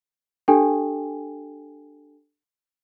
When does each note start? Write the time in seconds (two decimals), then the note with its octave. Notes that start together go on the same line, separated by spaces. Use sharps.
0.48 D4 G4 A4 G5 G#5